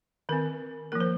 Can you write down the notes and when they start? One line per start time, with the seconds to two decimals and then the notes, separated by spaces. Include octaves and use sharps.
0.29 D#3 C4 A#4
0.92 F3 A#3 A#4
1.00 C5